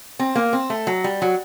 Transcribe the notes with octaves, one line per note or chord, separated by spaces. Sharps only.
C4
A#3
C4
A3
F#3
G3
F#3